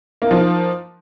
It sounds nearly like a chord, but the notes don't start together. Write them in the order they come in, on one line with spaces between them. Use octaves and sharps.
A#3 D#4 F3